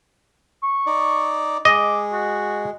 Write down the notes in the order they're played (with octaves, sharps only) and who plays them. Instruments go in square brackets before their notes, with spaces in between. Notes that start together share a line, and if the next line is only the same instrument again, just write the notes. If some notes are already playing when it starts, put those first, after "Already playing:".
[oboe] C#6
[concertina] D#4 D5
[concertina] G#3 [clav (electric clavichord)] D#5 [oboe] D6
[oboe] F#4